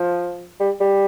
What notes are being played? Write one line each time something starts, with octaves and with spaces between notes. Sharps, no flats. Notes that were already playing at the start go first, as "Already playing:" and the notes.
Already playing: F3
G3
G3